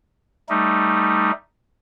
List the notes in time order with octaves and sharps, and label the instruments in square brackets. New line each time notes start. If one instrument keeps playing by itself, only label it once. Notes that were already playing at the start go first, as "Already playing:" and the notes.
[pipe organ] G3 A3 D#4